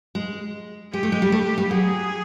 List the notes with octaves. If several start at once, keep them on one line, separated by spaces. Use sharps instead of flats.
G#3
G#3 G4
A3
G#3
G3
A3
G3
F#3 G#4